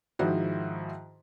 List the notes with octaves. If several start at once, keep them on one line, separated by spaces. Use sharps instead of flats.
G#2 D#3 F3 E4 F#4